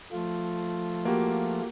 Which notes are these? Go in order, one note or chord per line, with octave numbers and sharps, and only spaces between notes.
F3 A3 F4
A#3 F#4 G4